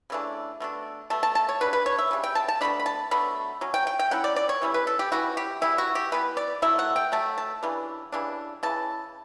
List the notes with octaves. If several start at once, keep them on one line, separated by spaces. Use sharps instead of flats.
C#3 E3 A3 D4
B2 A3 D4
B2 A3 A5
A5
A5
C#5
C#3 G3 D4 B4
B4
C#5
E5
C#3 G3 D4
G5
A5
A5
B2 F#3 A3 D4 B5
B5
A5
B2 F#3 A3 D4 B5
F#3 C#4
G5
G5
G5
F#3 C#4 E4 F#5
D5
D5
C#5
E3 G3 C#4 E4
B4
A4
G4
E3 G3 C#4 E4 F#4
G4
E3 G3 B3 E4
F#4
G4
E3 G3 B3 B4
D5
F#3 A3 E4 E5
F#5
G5
F#3 A3 A5
A5
C#3 E3 G3 D4
C#3 E3 G3 D4
C#3 E3 A5